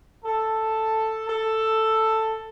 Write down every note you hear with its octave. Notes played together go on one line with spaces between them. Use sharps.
A4
A4